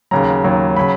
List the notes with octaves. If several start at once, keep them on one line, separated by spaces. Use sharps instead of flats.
D#2 C#3 F#3 A#5
D#2 C#3 F#3
C#3 F#3 B5